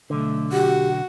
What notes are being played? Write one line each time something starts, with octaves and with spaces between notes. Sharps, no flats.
B1 D3 A3
F#4 G4 F#5